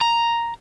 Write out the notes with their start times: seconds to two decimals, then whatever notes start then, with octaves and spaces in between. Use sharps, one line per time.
0.01 A#5